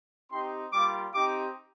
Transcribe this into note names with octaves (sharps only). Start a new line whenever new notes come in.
C4 D#4 G4 C6
G3 A#3 F4 D6
C4 D#4 G4 D6